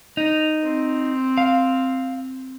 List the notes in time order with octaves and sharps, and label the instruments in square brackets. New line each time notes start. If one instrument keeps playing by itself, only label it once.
[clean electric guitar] D#4
[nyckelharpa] C4
[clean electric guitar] F5